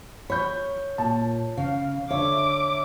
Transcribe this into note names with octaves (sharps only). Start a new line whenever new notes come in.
C#5 B5 G6
A#2 A5
C#3 F5
D3 C#5 E5 D6